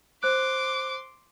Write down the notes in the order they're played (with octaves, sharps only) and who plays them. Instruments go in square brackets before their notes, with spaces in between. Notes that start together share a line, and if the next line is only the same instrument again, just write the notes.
[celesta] C5 F#6 [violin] C6 D6